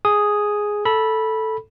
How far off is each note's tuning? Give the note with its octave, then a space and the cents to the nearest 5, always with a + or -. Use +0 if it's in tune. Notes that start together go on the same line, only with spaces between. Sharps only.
G#4 +0 D#6 +0
A4 +0 B5 -15